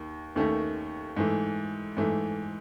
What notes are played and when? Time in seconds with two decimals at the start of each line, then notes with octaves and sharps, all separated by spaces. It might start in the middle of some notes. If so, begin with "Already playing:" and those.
Already playing: D#2 D#3
0.36 D#2 D#3 A3 C#4
1.16 G#2 E3 A3
1.97 G#2 E3 A3